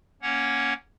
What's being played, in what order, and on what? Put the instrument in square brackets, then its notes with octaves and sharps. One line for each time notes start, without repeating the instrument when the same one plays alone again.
[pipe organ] A#3 C#4 C#5 F#5